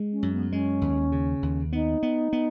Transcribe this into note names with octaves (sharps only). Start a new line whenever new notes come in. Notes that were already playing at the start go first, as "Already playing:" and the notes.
Already playing: G#3
C#4
F#2
B3
G#3 C#4
D#2
C#3
D#2
B3 D#4
B3
B3